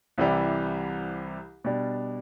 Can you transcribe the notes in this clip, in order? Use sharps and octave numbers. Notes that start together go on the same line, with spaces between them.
C2 C3 E3 G3
B2 G3 D4